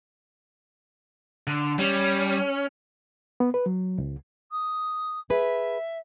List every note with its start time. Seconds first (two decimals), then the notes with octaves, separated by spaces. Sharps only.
1.47 D3
1.79 G3 C#4
3.40 B3
3.54 B4
3.66 F#3
3.98 C#2
4.51 D#6
5.30 G#4 B4 E5